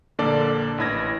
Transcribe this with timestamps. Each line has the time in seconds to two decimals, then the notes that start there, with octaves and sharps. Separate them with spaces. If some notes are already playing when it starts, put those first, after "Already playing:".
0.19 A#1 D3 A#3 A4 D5
0.78 A1 E3 B5 G#6 A#6